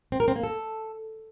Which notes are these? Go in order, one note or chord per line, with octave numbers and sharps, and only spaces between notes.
C4
A#4
C4
A#3
A4